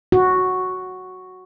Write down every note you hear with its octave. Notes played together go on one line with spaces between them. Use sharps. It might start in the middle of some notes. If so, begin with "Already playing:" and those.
F#4